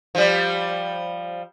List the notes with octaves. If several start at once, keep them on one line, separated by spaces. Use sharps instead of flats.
F3 G3